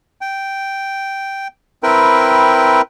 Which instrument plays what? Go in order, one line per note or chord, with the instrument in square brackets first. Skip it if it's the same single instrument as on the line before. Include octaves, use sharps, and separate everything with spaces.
[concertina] G5
C4 E4 A#4 B4 G5